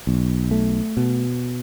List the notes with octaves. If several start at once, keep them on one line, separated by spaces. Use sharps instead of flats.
B1
A3
B2